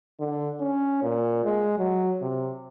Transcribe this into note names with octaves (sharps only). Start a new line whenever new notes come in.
D3
C#4
A#2
G#3
F#3
C3